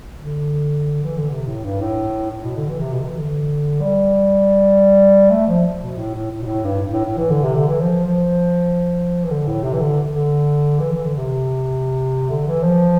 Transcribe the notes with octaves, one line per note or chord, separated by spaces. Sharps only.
D3
E3
D3
C3
A2
G2
A2
A2
B2
D3
E3
C3
B2
D3
E3
D3
G3
A3
F3
B2
A2
A2
A2
B2
A2
G2
A2
A2
E3
D3
C3
D3
E3
F3
F3
E3
D3
A2
C3
E3
D3
D3
E3
E3
D3
C3
D3
E3
F3